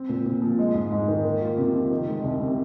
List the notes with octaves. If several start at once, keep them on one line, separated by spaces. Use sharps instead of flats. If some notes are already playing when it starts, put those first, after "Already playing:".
Already playing: C4
A#2
A#2
F3
G#3
G#2
G#2
D#3
A#3
F4
C3
F3
D#3
G#3
C2
C3